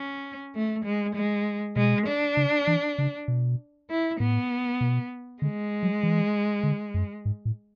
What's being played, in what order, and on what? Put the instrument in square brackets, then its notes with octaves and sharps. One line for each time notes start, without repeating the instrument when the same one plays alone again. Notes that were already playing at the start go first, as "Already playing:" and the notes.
Already playing: [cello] C#4
A3
G#3
G#3
[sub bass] B2 [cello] G#3
[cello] D4
[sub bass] C#3
E3
C#3
B2
[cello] E4
[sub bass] A2 [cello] B3
[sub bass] B2
[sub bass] D3 [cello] G#3
[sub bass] F#3
E3
D3
F#2
G#2
A2